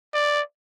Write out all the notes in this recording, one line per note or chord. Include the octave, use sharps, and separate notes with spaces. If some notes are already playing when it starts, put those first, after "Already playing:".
D5